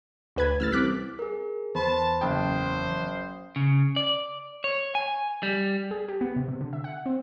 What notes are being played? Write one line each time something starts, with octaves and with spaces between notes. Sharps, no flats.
D2 B4 G#6
A1 E6 F6 A6
C2 D6 F#6 B6
G#4 A#4
E2 C5 A5 B5 C6
F#1 C5 G5 D#6 F#6
C#3
D5
C#5
G#5
G3
G#4
G4
B3
C3
C3
D3
E5
F#5
C4